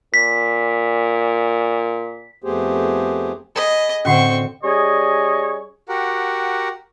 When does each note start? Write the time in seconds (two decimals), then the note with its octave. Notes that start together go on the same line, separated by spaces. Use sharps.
0.14 A#2 B6
2.44 F2 A3 B3 G4 G#4 C5
3.55 G#4 D#5 B5 D#6
4.05 A2 D3 C4 C#4 F#4 F#5 C#6
4.63 G3 C#4 G4 G#4 C#5 D#5
5.89 F#4 G4 A#4 F#5